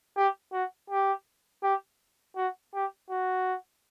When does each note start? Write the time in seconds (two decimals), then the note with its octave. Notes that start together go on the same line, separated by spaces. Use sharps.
0.17 G4
0.53 F#4
0.90 G4
1.63 G4
2.36 F#4
2.74 G4
3.10 F#4